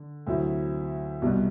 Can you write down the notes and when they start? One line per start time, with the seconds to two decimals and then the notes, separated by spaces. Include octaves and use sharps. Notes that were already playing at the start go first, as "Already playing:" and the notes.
Already playing: D3
0.26 D2 C3 F#3 C4 E4
1.22 C2 B2 G3 B3